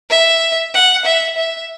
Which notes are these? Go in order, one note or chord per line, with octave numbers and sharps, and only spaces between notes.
E5
F#5
E5
E5